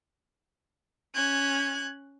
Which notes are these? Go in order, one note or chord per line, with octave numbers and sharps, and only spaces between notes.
C#4 F#6 G#6